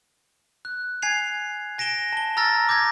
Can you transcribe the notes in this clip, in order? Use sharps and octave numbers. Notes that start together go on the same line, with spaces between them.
F#6
G#5 G#6 C7 F7
G#5 A#6 D7 E7 G7
A5 G7
A#5 E6 F6 A6 A#6
D6 G6 G#6 A#6